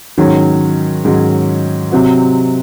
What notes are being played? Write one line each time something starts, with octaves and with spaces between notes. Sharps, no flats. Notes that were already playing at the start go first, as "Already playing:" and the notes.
G#2 D#3 F#3 C#4
G#2 D#3 F#3 C#4
C3 F#3 C4 F#4